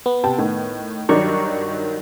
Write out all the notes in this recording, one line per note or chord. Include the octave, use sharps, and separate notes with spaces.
B3
C3 G5 A5
A2 D#3
G2 D#3 F#3 D5 A#5 C#6